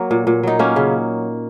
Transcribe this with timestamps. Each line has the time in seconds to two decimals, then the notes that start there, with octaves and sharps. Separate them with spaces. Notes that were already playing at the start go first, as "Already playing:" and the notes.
Already playing: F#3 A#3
0.11 A#2
0.27 A#2
0.43 F#3 D#4
0.59 F#3 A#3 C#4
0.76 C#3